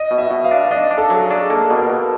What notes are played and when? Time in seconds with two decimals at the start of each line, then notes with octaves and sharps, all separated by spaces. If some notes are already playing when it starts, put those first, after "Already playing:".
Already playing: D#5
0.11 B2
0.18 E5
0.31 B2
0.44 F5
0.51 D4
0.71 D4 D#5
0.91 D4
0.98 A4
1.10 F#3
1.24 G#4
1.31 D4
1.50 A#3 A4
1.70 B2
1.77 A#4
1.90 B2